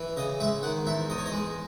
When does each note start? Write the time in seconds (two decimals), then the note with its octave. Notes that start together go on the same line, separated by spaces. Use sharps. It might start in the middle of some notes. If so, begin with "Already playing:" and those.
Already playing: E3
0.17 C#3 D#5
0.40 G#3 E5
0.63 D#3 F#5
0.86 E2 E5
1.10 E2 D#5
1.18 C#5
1.26 D#5
1.32 G#3